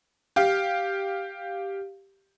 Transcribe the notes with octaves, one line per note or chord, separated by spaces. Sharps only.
G4 F5